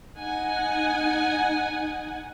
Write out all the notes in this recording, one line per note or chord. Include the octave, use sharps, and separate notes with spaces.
D#4 F#5 G#5